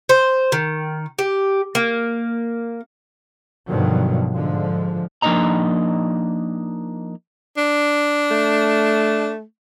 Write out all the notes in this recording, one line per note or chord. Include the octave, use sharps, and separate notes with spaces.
C5
D#3
G4
A#3
G2 B2 D3 D#3 F3 F#3
G#2 D3 F3
F3 A#3 D4 D#4 D#5 A#5
D4
A3